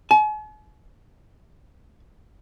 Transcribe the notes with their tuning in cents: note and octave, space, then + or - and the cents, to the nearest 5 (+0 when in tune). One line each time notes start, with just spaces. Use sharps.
G#5 +45